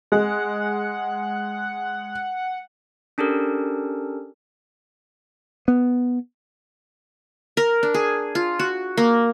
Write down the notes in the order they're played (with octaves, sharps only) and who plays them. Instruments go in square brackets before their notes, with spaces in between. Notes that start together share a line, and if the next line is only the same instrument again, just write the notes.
[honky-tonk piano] G#3 [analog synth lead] F#5
[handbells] C#4 D4 G4 A4 A#4
[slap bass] B3
[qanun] A#4
D4
G#4
F4
F#4
A#3